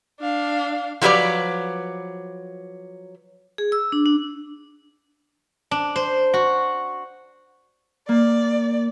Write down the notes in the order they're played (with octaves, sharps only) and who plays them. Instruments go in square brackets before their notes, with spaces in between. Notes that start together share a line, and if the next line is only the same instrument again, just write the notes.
[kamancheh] D4 F5
[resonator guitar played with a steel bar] F3 F#3 G4 B4 D5
[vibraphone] G#4
E6
D4
D4
[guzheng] D4
C5
F#4
[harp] A#3 [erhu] D5